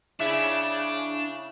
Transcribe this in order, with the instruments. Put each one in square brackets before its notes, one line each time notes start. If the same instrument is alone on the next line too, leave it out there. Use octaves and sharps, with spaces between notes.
[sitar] C#3 E4 E5 [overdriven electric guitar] D4